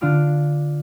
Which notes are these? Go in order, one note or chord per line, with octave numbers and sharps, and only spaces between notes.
D3 D4 F4 F6 D7